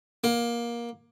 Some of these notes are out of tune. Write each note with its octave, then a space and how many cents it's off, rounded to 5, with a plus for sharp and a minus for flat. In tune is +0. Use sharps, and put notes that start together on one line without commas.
A#3 +20